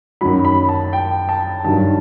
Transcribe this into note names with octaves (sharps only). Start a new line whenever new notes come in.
F#2 D#3 F#3 B5
B5
A5
G5
A5
G2 D#3 F#3 A5